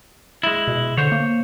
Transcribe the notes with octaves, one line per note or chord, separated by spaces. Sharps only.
G#3 E4
B2
D3 C5 C#5
A#3